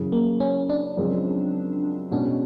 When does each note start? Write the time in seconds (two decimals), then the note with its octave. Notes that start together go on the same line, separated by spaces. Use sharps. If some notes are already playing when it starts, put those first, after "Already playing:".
Already playing: F#2 C#3 E3
0.12 A#3
0.40 C#4
0.69 D4
0.97 F#2 C#3 F3 G#3 C4
2.11 B2 G#3 C#4 D4